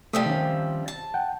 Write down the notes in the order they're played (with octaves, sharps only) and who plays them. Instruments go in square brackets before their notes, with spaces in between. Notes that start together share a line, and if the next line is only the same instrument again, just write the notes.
[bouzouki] C3 F3 G3 [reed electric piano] A3 D#6
[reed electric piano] D#3 C#4
[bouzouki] A5
[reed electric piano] F#5 G5